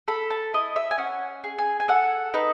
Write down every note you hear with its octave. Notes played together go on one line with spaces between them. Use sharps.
A4 B5
A5
E4 D#5
E5
G#5
C#4 F#5
G#4
G#5
G#5
A4 F#5
D#4 B4